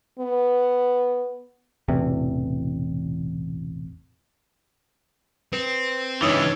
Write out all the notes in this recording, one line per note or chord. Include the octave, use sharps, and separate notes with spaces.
B3
E1 A1 E2 C3
C4 B4
C#2 E3 D4 D#4 G4 C#5 D#6